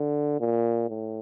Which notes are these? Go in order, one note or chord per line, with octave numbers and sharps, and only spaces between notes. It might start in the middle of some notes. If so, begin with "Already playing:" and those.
Already playing: D3
A#2
A2